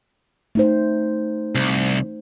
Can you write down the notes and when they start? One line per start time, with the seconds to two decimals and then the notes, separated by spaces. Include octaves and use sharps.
0.55 A3 D#4 C5
1.55 C2